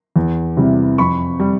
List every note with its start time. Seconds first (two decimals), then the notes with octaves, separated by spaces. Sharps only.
0.16 E2
0.57 C3 E3 G3
0.98 F2 B5 C#6
1.40 G3